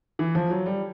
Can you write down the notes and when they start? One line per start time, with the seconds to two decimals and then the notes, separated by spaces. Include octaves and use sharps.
0.19 E3
0.35 F3
0.50 F#3
0.66 G3